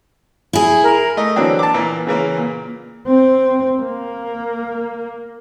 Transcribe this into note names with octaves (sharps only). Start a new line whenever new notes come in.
E4 G#4
A#4
A3 D#5
D3 E3 F#3 A#3 C4 D4
A5 D6
A#2 E3 A#3
C#3 E3 A#3
A#2
C4
A#3